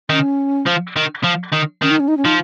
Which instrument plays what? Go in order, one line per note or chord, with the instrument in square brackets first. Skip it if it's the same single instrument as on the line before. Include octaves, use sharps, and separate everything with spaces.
[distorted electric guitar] D#3 [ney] C#4
[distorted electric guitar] F3
D#3
F3
D#3
[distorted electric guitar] D#3 [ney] C#4
[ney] D#4
C#4
D#4
C#4
[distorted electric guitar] F3 [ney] D#4